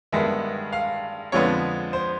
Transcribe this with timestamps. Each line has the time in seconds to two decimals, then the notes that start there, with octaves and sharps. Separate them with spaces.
0.12 G2 D#3 G#3 B3 E5
0.73 F5
1.32 F2 D3 F3 G#3 B3 C#5
1.93 C5